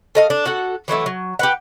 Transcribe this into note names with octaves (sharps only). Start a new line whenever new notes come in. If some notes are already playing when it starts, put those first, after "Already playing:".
A3 D#5 F5
D4
F#4 A4 F#5
E3 F#3 A3 E4
F#3
G4 B4 F#5